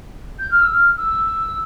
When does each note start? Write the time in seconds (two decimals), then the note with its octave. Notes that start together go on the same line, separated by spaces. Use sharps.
0.39 G6
0.51 F6
0.62 E6
0.74 F6
0.98 E6